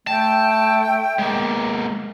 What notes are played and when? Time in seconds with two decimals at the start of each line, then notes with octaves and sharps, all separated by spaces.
0.07 A3 G5 A5
1.19 G#3 A#3 B3